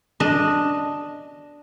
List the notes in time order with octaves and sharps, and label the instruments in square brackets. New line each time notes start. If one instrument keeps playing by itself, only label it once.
[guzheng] D4 D#5